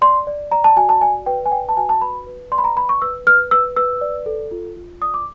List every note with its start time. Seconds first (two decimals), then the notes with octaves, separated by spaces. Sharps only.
0.01 D5 C6
0.27 D5
0.51 D5 A#5
0.64 A5
0.77 F#4 G#5
0.89 A5
1.01 D5 G#5
1.26 B4 G5
1.46 G#5
1.51 D5 G5
1.69 A5
1.77 F#4 G#5
1.89 A5
2.02 B4 B5
2.26 B4
2.52 D5 C6
2.58 B5
2.64 A#5
2.76 B4 B5
2.89 C#6
3.02 B4 E6
3.27 B4 F6
3.51 B4 E6
3.76 B4 E6
4.01 D5
4.26 A4
4.51 F4
4.76 F4
5.01 D5 D#6
5.14 D6